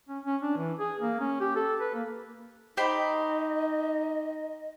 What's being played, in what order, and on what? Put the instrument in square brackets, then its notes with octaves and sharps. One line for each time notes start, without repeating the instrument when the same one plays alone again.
[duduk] C#4
C#4
D4
E3
G#4
A#3
C#4
G4
A4
B4
A#3
[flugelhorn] D#4 [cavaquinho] G4 C5 B5 [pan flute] D#5